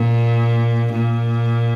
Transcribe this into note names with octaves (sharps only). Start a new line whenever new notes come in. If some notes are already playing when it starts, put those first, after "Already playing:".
Already playing: A#2
A#2